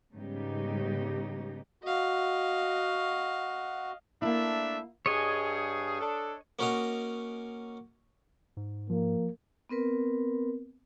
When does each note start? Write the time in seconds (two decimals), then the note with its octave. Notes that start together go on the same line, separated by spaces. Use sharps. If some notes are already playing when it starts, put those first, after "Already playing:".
0.14 G#2 C#3 G3 B3 D#4 G4
1.84 F#4 D#5 F5
4.22 A3 A#3 D4 E4 E5
5.06 G2 G#4 C#5 D#5 G#5
6.00 D4 A4
6.59 A#3 C#4 F#4 A#4 D#5 A#5
8.57 G#2
8.90 F3 A#3
9.69 B3 C4 A#4 B4